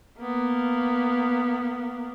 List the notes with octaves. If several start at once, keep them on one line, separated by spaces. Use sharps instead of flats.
A#3 B3